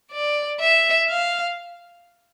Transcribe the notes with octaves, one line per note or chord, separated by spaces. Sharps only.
D5
E5
F5